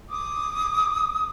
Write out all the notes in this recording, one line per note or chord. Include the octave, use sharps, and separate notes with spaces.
D6 D#6